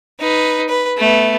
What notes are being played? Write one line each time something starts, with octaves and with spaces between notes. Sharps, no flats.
D#4 B4
B4
A3 B3